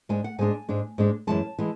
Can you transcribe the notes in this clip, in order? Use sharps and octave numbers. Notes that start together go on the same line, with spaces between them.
G#2 G#3 D4 G#5
F#5
G#2 G#3 D4 G#5
G#2 G#3 D4
G#2 G#3 D4
F#2 E3 G#3 A5
E3 G#3